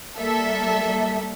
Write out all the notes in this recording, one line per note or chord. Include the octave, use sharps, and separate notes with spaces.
G3 A#3 A4 E5